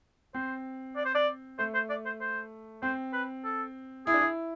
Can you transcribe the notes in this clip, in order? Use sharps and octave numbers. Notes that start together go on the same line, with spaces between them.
C4 C5
D5
C5
D5
A3 C5
C5
D5
C5
C5
C4 C5
B4
A4
E4 G#4
D4
E4